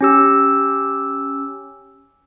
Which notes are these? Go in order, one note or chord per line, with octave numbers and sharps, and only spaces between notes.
C#4 G4 E6